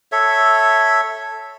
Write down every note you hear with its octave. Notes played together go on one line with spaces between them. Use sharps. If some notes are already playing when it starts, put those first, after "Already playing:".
A4 C#5 E5